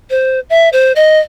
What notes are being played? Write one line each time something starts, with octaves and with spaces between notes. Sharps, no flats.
C5
E5
C5
D#5